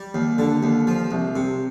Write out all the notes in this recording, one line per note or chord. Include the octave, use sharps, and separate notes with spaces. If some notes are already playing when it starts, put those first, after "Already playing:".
Already playing: G3
D#2
D3
D#2
F3
C2
C3